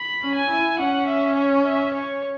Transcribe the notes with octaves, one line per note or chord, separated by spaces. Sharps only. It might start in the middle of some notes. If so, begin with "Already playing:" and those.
Already playing: B5
C#4
G#5
E4
C#4 F#5
E5
C#5
E5
C#5